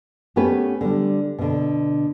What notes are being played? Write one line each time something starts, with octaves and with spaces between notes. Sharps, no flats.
A3 B3 C#4 G4 B4
D3 G3
B2 D3